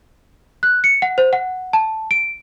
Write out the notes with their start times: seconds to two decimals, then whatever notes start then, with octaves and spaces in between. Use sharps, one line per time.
0.63 F#6
0.84 C#7
1.02 F#5
1.18 C5
1.33 F#5
1.73 A5
2.11 D7